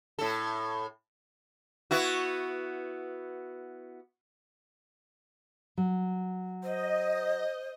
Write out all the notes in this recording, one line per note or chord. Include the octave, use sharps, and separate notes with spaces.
A2 A4
B3 E4 F#4
F#3
C5 D#5